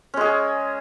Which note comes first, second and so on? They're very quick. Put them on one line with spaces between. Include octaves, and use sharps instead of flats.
C#4 G#3 G#4